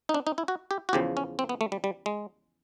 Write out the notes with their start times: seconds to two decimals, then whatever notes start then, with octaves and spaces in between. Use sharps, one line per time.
0.09 D#4
0.14 D4
0.27 D#4
0.38 E4
0.48 F#4
0.71 G4
0.89 F#4
0.93 E2 C#3 F3 G4
1.17 C#4
1.39 C4
1.49 B3
1.61 A3
1.72 G3
1.84 G3
2.06 G#3